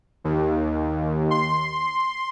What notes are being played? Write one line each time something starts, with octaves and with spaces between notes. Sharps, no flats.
D#2
C6